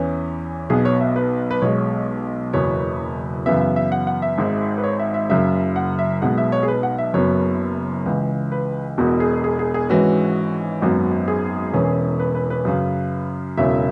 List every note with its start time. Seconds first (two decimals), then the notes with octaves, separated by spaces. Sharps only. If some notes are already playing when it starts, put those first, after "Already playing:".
Already playing: E2 E3 C#4
0.70 B1 B2 B3 G#4
0.85 C#5
1.01 E5
1.16 B4
1.51 B4
1.62 B1 B2 G#3 C#5
2.53 F#1 E2 B2 F#3 B3 C#5
3.46 F#2 C#3 E3 B3 E5
3.61 E5
3.76 E5
3.92 F#5
4.07 F#5
4.22 E5
4.38 G#1 G#2 G#3
4.78 B4
4.84 C#5
4.99 E5
5.14 E5
5.29 F#1 F#2 C#3 E5
5.76 F#5
5.99 E5
6.22 B1 B2 G#3 B3 F#5
6.38 E5
6.52 C#5
6.63 G#4
6.68 B4
6.83 F#5
6.98 E5
7.13 F#1 F#2 F#3 B3 C#5
8.06 C#2 C#3 E3
8.52 B4
8.98 E1 E2 B2 F#4
9.20 G#4
9.44 G#4
9.59 G#4
9.74 G#4
9.89 G#1 G#2 E3 G#3 C#4 F#4
10.82 G#1 F#2 F#3 B3 F#4
11.28 G#4
11.73 E1 E2 E3 C#4
12.20 B4
12.35 B4
12.50 B4
12.65 F#2 C#3 F#3
13.57 E1 E2 C#3 F#3 C#4 E5